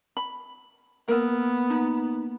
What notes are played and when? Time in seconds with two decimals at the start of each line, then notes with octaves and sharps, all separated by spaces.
0.17 B5
1.08 A#3 B3 A#4 E6
1.70 D#4